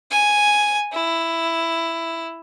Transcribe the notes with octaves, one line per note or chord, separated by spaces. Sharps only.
G#5
E4